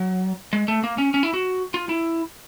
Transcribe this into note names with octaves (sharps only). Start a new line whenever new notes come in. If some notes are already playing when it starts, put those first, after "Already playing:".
Already playing: F#3
G#3
A3
A#3
C#4
C#4
E4
F#4
F4
E4